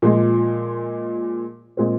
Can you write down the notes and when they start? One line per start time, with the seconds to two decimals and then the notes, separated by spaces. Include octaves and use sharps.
0.02 A#2 F3 G#3
1.77 A#2 G#3 C4